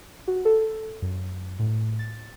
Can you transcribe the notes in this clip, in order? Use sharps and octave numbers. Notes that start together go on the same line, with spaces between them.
F#4
A4
F#2
A2
A6